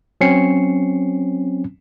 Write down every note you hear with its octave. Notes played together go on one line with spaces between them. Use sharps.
F#3 C4 C#4 C7 C#7